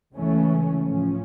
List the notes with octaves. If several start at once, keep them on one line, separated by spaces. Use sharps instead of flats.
C#2 C#3 E3 A3 C#4
A2 F3 C#4